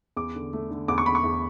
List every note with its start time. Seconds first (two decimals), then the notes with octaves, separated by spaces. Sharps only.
0.17 E2 D6
0.35 D3
0.53 A3
0.71 D3
0.88 E2 D6
0.98 C#6
1.06 E2 B5
1.15 C#6
1.24 E2